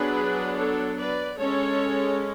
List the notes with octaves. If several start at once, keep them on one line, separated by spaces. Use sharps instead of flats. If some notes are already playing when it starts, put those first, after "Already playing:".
Already playing: F#3 B3 D4 G#4 B4
A4 C#5
B4 D5
G#3 C#4 A4 C#5